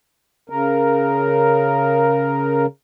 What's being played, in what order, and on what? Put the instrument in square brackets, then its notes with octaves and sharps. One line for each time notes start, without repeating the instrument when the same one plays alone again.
[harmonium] C#3 A#4